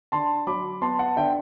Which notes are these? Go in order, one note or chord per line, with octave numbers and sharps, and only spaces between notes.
D3 A5 C6
F#3 B5 D6
B3 A5 C6
F#5 A5
D3 E5 G5